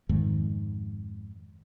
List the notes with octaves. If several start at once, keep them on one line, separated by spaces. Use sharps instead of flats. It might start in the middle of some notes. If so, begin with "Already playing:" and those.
F2 G#2 D#3